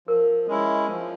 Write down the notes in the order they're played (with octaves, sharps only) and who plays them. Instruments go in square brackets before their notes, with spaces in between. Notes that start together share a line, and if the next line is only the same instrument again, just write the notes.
[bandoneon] F3 [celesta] A#4
[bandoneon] G#3 C#4 E4
F3